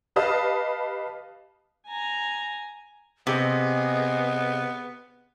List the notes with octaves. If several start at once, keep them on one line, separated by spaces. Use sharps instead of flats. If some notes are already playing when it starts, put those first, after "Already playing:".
G4 B4 D#5 F5 A5 D#6
G#5 A#5
C3 B3 G#4 D#5